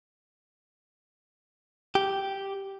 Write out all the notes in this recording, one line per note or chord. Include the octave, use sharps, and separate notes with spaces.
G4